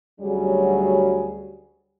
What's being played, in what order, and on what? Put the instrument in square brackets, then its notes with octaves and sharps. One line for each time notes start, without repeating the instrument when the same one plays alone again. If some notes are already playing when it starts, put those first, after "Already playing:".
[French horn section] D2 F#3 G3 C#4 F#4 G#4